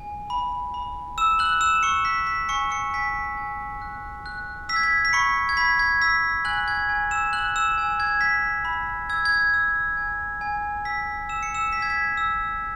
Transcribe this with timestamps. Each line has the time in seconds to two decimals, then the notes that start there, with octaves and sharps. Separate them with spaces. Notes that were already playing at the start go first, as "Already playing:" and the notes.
Already playing: G#5
0.30 B5
0.74 B5
1.18 E6 E7
1.39 F#6 F#7
1.61 E6 E7
1.75 E7
1.83 C#6 C#7
2.05 F#6 B6
2.27 B6
2.49 G#5 C#6 C#7
2.71 C#6 C#7
2.94 G#5 B6
3.37 G#5
3.82 F#6
4.26 F#6
4.69 E6 B6
4.76 G#6
4.83 B6
5.05 B6
5.13 B5 C#6 C#7
5.49 G#6
5.57 B5 B6
5.79 G#6
6.02 E6 B6
6.45 G#5 F#6 F#7
6.68 G#6
6.89 G#5
7.11 E6 E7
7.33 G#5 F#6 F#7
7.56 E6 E7
7.78 G#5
8.00 G#6
8.21 F#6 B6
8.65 B5
9.10 E6 G#6
9.25 G#6
9.54 E6
9.97 G#5
10.41 G#5
10.85 E6 B6
11.29 E6 E7
11.43 C#7
11.55 E6 E7
11.73 G#5 B6
11.82 G#6
11.90 B6
12.17 E6